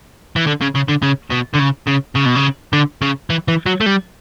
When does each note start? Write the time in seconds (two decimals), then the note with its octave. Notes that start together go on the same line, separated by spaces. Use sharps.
0.36 E3
0.47 D3
0.61 C#3
0.75 C#3
0.88 D3
1.02 C#3
1.32 B2
1.55 D3
1.60 C#3
1.87 C#3
2.16 C#3
2.26 B2
2.36 C#3
2.73 D3
3.02 C#3
3.30 E3
3.48 E3
3.66 F#3
3.81 A3
3.86 G3